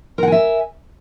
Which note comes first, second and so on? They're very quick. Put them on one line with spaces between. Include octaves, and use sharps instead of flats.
A#4 F#5 G#5 E5